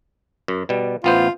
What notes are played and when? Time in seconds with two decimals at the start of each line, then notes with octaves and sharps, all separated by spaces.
0.48 F#2
0.69 B2 G3
1.04 A1 B3 F4 C5